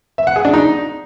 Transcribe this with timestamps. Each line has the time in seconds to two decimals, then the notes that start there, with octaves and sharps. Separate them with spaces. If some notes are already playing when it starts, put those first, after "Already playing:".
0.18 E5
0.27 F#5
0.36 G#4
0.45 D4
0.54 D#4